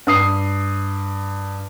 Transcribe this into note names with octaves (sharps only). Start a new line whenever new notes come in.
G2 D#6 C7